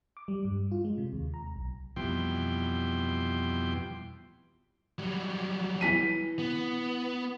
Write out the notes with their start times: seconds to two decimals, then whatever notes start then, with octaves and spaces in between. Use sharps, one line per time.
0.17 D6
0.28 G3
0.45 G2
0.72 F4
0.85 G#3
0.98 C3
1.12 D#2
1.34 A#5
1.56 B1
1.96 F2 B2 E3 G3 G5 C6
4.99 F#3 G3
5.81 E3 B6 D#7
6.39 B3